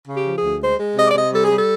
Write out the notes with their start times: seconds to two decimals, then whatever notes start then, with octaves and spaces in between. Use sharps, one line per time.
0.08 C#3
0.14 G4
0.25 F3
0.37 G#4
0.43 D2
0.61 G#3 C5
0.80 G#3
0.96 C3 D#5
1.07 D5
1.14 C3 D#5
1.32 G3 A4
1.44 G#4
1.50 G3 A4